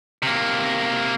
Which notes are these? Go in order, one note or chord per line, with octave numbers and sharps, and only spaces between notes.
C3 A#3